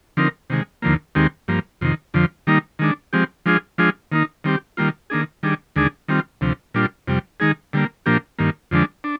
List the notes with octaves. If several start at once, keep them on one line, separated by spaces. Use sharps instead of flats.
D3 F3 C4 D#4 A#4
C3 D#3 G#3
D#2 D3 F3 A#3
D#2 D#3 G#3 C4 G4
G2 F3 A#3
F2 C3 D#3
F2 D3 F3
D#3 G3 A#3 D#4
D#3 G#3 D4
F3 G#3 C4 G4
F3 G#3 D4 F4 G#4
F3 G#3 D4 F4 G#4
D#3 A#3 D#4
D#3 G3 C4 G4
D#3 G3 A#3 F4
D#3 A#3 D4 G#4
D#3 G3 D4 G#4
D#2 D3 G#3 D4 G#4
D#3 G3 C4 F4
D2 C3 F3
A#2 G3 D4 F4
F2 C3 G3
D#3 G#3 D#4 G#4
D3 G3 A#3
A#2 F3 A#3 D4 G4
G2 D#3 A#3
F2 D3 F3 G#3 D4
D4